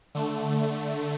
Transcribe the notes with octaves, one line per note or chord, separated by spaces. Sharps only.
D3 A3